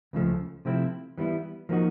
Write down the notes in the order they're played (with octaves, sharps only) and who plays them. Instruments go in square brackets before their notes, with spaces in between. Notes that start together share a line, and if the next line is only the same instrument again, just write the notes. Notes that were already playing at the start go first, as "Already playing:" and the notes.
[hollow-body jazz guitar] C#2 C#3 F3 A3
C3 F3 A3 C4 E4
E3 G3 B3 E4
F3 A#3 D#4 F#4